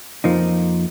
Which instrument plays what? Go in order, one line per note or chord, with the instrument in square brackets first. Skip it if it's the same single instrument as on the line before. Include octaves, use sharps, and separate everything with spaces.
[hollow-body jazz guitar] F2 F3 A#3 D#4